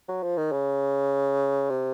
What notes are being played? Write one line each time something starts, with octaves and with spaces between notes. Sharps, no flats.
F#3
F3
D#3
C#3
C3